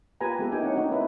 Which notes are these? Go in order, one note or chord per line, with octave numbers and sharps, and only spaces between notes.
A#3 F4 G4 B4 G#5 A#5
G#3 B3 G4 A4
A#3 D#4 E4 G4 G5 G#5
C4 D#4 C#5 F#5
A3 C#4 D#4 F#4
C4 E4 A#4 B4 E5